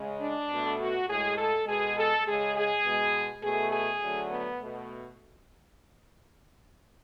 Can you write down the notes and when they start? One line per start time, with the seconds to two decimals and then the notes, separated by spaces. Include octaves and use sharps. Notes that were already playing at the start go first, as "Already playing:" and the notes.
Already playing: C#3 G#3
0.21 D4
0.50 B2 A3
0.80 F#4
1.08 A2 G#3 G#4
1.37 A4
1.66 B2 G#3 G#4
1.97 A4
2.26 C#3 G#3 G#4
2.56 G#4
2.84 B2 G#3
3.43 B2 A3 G#4
3.72 G#4
4.02 D3 F#3 A3
4.32 B3
4.60 B2 A3